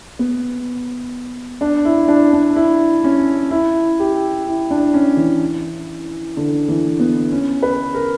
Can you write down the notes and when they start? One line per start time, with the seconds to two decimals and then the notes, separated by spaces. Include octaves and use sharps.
0.19 B3
1.61 D4
1.85 E4
2.08 D4
2.33 D4
2.56 E4
3.04 C#4
3.51 E4
3.99 G4
4.47 E4
4.71 D4
4.94 C#4
5.17 E3
6.37 D3
6.69 E3
7.00 B3
7.32 C#4
7.63 B4
7.95 A#4